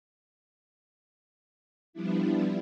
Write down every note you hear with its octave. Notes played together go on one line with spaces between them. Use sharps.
F3 G3 B3 D4 E4